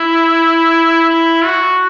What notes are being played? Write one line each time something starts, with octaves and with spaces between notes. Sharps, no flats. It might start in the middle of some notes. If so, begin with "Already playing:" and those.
Already playing: E4
E4
F#4